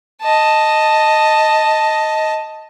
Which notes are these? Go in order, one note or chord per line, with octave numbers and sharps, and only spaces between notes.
D#5 A5